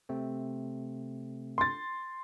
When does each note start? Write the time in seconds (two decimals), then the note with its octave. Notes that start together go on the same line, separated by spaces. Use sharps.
0.09 C3 A3 C4
1.58 C6 A6